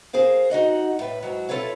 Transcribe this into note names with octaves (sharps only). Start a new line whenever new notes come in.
G#4 A#4 C5 F5
D#4 F#4 D#5 F#5
A2 B4
G#2 F#3
E4 F4 A4 B4 C#5 F5